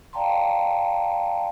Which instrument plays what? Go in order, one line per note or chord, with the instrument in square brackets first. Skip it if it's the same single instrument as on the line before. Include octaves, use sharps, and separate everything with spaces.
[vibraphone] D5 F5 G5 A5 A#5 C6